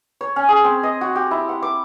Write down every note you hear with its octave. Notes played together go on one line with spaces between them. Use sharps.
C#5
C#4
G#4
C4
D#5
F#4
G4
E4
F#5
D6